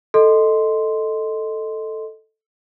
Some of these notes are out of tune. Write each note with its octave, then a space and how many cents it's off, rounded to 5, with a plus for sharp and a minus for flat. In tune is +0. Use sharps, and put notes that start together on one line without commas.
A4 +0 D#5 +0 C6 -5